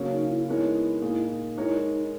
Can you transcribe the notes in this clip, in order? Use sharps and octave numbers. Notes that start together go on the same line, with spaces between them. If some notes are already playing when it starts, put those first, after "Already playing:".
Already playing: C#3 F#3 A#3 C#4
D#4
E4
G#3 B3 D#4 E4 A#4 C#5
A#2 A#3 D#4 G#4
G#3 D#4 E4 A#4 C#5
D#4